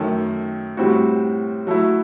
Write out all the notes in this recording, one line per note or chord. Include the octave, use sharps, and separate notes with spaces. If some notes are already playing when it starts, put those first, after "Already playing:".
Already playing: F#2 D#3 A3
A2 G3 C4 F#4
F#3 A3 E4